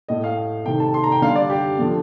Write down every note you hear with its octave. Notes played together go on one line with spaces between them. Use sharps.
A2 A3 D#5
F5
C3 D#3 A3 G5
A5
C6
A#5
G5
D3 G3 F5
D5
G4
D3 F3 A3